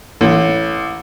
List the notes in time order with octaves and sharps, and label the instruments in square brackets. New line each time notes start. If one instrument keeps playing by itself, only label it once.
[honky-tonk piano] A1